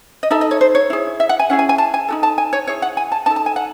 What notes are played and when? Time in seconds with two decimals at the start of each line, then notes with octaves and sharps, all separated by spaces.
0.23 D#5
0.31 D#4 A4 E5
0.41 D#5
0.51 C#5
0.61 C5
0.75 C#5
0.90 E4 G#4
1.20 E5
1.29 F#5
1.39 G#5
1.50 C#4 E4 G#4 F#5
1.59 G#5
1.69 G#5
1.78 A5
1.94 G#5
2.08 D#4 F#4 A4
2.23 A5
2.38 G#5
2.53 C#5
2.67 E4 G#4 C#5
2.82 F#5
2.97 G#5
3.12 A5
3.26 D#4 A4 A5
3.36 A5
3.46 G#5
3.56 F#5